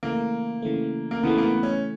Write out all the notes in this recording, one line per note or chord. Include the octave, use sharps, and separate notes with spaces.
C#3 E3 A3 A#3
C#3 E3 A3
A#3
C#3 E3 A3 B3
A#3
B3
C#4